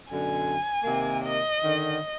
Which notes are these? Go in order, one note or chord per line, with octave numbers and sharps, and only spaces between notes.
F#2 B2 D3 G#5
C3 D#3 A#3
D#5
D3 D#3